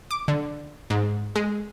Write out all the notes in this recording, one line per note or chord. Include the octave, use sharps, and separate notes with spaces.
D6
D3
G#2
G#3